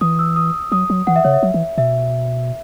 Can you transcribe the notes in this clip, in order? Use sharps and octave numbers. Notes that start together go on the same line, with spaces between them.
E3 D#6
E6
D#6
F#3 D#6
F#3
E3 F#5
E5
C#3 C#5
E5
F#3
E3
B2 E5